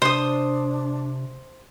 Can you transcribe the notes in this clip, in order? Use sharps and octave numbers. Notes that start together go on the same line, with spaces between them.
C3 D4 C5 D#6